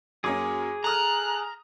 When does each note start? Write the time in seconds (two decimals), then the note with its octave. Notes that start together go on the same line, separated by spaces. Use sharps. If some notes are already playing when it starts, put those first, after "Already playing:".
0.24 F#2 A#3 C#4 G#4 D6
0.84 A4 A#5 D#6 F6 F#6